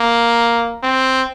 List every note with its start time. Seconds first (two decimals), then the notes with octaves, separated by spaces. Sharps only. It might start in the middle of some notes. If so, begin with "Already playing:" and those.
Already playing: A#3
0.83 C4